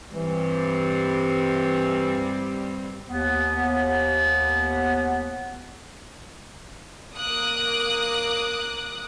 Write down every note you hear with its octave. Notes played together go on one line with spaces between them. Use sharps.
G2 E3 G3 C4
D#2 B3
A#3 D6 D#6 F#6